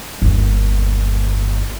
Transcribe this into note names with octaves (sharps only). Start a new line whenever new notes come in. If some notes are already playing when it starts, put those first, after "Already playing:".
G1 D#2